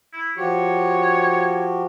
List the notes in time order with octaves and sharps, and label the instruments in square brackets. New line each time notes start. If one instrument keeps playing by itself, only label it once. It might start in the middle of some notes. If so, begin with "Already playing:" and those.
[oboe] E4
[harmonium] F3 F#4 G4 [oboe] C#5